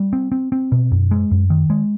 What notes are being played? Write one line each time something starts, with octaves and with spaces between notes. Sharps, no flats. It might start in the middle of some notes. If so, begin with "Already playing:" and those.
Already playing: G3
C4
C4
C4
B2
F#2
G#3
F#2
D#3
G#3